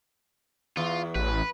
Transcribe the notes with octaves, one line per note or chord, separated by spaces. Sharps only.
E2 F4
A1 B4